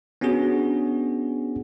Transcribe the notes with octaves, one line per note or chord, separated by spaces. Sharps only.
B3 C#4 D4 F#4 G#4